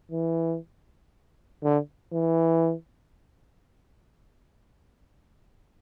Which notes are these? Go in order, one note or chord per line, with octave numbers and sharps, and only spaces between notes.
E3
D3
E3